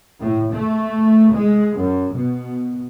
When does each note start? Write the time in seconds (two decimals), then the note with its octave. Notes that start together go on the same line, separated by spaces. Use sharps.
0.20 A2
0.53 A3
1.31 G#3
1.77 F#2
2.16 B2